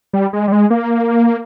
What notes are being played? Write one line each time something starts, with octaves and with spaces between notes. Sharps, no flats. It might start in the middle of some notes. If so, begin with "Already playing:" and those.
G3
G#3
G3
G#3
A#3